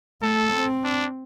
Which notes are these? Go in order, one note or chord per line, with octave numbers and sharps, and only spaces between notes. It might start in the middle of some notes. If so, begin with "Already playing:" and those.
A3 A4
C4
D4